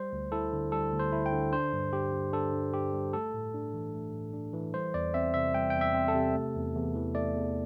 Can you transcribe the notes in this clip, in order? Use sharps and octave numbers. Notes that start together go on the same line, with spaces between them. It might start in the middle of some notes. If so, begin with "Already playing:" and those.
Already playing: G3 C5
D2
E4 A4
D3
G3 A4
D2
C5
E4
G5
D3
D4 C5
G2
G2 G4
G3
D4 A4
G2
G2 G4
G3
A3 A4
A2
D4
E3
A3
A2
D4
E3
G3 C5
E2 D5
C4 E5
C3 E5
G3 G5
E2 G5
E5
C4
A4
C3
A3
E2
E2
E3
A3 D5
E2